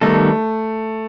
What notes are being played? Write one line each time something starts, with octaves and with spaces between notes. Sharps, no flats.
D#3 G3 A3 B3 D#4 A4